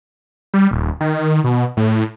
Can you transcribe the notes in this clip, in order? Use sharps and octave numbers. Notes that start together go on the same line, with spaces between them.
G3
D#1
D#3
B2
A2